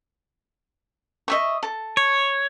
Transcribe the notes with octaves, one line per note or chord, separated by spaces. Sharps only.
D#5 E5 C#6
A4
C#5